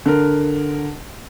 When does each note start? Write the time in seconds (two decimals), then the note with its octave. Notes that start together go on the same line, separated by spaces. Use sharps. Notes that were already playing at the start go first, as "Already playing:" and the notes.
0.06 D3 A#4